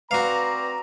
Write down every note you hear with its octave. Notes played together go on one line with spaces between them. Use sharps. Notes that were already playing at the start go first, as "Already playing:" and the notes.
C4 F#4 B4 D5 F5 A#5